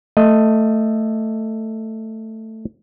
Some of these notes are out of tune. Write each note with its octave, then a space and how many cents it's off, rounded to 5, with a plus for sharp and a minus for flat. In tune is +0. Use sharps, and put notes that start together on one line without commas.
A3 +10 D#5 +0